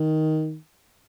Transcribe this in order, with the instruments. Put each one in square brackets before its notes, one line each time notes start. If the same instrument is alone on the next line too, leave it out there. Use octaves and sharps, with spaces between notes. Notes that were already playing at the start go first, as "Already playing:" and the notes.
Already playing: [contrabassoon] D#3